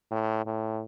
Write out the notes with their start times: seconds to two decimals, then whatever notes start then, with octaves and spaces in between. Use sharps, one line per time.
0.11 A2
0.46 A2